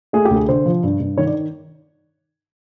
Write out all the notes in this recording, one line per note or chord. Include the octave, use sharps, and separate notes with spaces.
A3 G#4
G4
D2
G#4
D3 C5
F3
G2
G2
D#3 C#5
D5